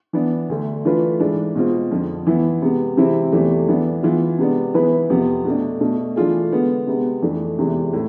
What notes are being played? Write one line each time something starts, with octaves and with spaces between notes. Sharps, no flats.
E3 B3 D4
D2 D3 A3
E3 A3 D4 F4 B4
G#2 E3 G#3 D4
B2 G#3 C4 F4
F2 D3 F3
E3 B3 E4
C3 G#3 B3
C3 E3 G#3 C4 E4
E2 C3 E3 A3
E3 B3 D4
E3 B3 F4 G#4
C3 G#3 B3 D4
E3 B3 E4 G#4 B4
F2 C3 F3 B3
B2 A3 D4
B2 A3 D4 A4
E3 A3 D4 F4 G#4
D3 G#3 B3
C3 G#3 B3
F2 E3 A3 D4
E2 C3 E3 G#3
A2